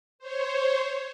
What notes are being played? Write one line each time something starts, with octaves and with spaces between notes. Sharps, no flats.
C5 C#5